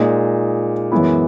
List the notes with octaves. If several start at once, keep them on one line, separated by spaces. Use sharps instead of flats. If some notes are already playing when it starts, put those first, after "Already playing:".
Already playing: A#2 G#3 D#4
F#2 E3 G#3 B3 E4